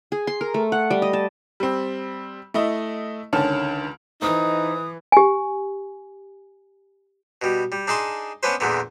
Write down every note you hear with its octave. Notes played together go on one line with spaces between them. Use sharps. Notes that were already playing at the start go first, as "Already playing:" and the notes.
G#4
C6
A#4
A3
F#5
G3
D#5
A5
G3 C4
A3 E4 D#5
C#2 D3 D#3 C#4 A5 F6
E3 D#4 A4 C5 D#5 D#6
G4 G#5
B2 G3
G3
D4 D#4 G#4 A5 C6
B3 C#4 D4 B4 C5
E2 A#2 D3 B3